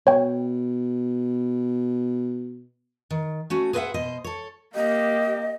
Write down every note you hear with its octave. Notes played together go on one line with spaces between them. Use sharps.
B2 C#5 G5
D#3
A3 C#4 F#4
G#4 B4 C5 D5 E5 F#5
B2 C5 D#5
A4 C#5
A#3 G4 D#5